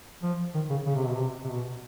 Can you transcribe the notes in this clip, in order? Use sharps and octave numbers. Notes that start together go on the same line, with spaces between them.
F3
D#3
C#3
C#3
C3
B2
C3
C3
B2